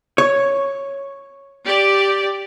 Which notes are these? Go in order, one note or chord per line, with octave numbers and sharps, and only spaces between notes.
C#5
G4 D5